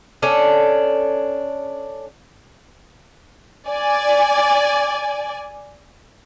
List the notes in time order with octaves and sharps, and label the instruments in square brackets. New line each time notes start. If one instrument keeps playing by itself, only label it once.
[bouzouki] C#4 D4 A4
[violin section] D5 G#5